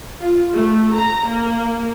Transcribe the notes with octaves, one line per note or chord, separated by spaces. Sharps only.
F4
A3
A#5
A#3